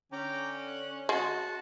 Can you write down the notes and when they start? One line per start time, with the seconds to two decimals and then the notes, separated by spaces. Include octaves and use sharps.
0.12 D3 C#4 G5 A#5 D6
0.67 F#6
1.09 G#3 F#4 A5